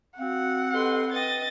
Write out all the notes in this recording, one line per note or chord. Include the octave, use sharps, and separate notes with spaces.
C4 F#4 F5 F#5
G4 A4 B4 D#5 C6
B4 D#5 G5 A6